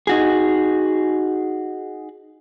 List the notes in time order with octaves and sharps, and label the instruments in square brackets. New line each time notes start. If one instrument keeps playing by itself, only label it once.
[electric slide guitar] D#4 F#4 G#4